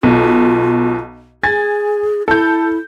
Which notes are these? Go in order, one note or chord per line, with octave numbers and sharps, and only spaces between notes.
B1 B2 F4
G#4 G#5 G#6 A6
E4 A4 G6